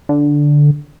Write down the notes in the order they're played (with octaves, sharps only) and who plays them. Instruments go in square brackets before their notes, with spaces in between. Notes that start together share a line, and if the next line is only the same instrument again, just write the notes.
[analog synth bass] D3